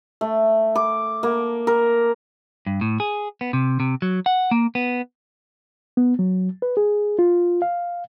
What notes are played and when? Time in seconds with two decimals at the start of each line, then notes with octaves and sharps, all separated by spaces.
0.21 A3
0.76 D6
1.23 A#3
1.67 A#4
2.67 G2
2.81 A2
3.00 G#4
3.41 B3
3.53 C3
3.80 C3
4.02 F#3
4.26 F#5
4.51 A#3
4.75 B3
5.97 B3
6.19 F#3
6.62 B4
6.77 G#4
7.19 F4
7.62 F5